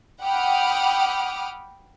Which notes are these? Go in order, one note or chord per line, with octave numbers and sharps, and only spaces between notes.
F#5 G5 B5 D6 D#6 F6